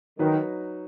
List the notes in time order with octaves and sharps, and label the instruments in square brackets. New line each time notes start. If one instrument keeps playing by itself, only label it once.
[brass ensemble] D#3 [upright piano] F#3 D#4 B4